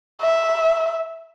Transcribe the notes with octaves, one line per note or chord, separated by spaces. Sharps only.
E5